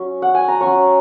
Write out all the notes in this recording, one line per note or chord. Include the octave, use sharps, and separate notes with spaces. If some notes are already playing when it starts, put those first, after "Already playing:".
Already playing: F#3 C#4 C#6
F#5
G#5
A#5
C#4 C#6
F#3